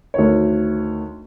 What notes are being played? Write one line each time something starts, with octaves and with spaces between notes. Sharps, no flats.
D2 D#3 C#5